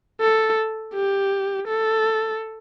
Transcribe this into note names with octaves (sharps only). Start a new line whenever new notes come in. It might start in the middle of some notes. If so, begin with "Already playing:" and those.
A4
G4
A4